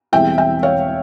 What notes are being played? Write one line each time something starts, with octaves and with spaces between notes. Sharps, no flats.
E1 E2 E3 G3 C4 E5 G5
E5 G5
C#5 F5